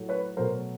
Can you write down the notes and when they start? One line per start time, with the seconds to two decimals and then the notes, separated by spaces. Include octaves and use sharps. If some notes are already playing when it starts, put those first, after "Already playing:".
Already playing: A2 F#3 A3
0.09 B4 C#5
0.37 B2 F#3 A3 A#4 C5